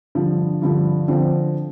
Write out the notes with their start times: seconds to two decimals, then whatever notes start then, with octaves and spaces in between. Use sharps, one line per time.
0.15 G2 D3 F3
0.62 G2 D3 F3
1.08 D3 F3 C4